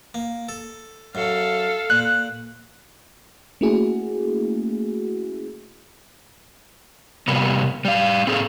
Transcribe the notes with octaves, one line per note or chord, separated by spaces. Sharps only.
A#3
A4
F#2 A4 F5
A#2 F#6
A3 A#3 C#4 E4 F#4 G#4
C3 G3 A#3 B3
G3 F5
C4 G#4 A4